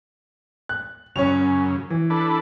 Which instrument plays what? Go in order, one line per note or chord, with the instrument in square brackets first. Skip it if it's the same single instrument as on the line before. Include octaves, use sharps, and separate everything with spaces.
[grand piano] F#6
[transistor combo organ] F#2 C#3 [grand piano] C#4 C#6 F7
[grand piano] E3
[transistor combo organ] D4 A4 B4